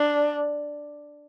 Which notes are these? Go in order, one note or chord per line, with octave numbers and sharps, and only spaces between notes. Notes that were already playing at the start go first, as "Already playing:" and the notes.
Already playing: D4